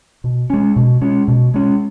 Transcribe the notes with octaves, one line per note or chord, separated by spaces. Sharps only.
B2
G#3 C#4
B2
G#3 C#4
B2
G#3 C#4